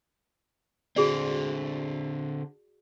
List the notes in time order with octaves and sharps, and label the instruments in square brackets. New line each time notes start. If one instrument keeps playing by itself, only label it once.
[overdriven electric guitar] D3 C4 [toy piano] F#4 G#4 D5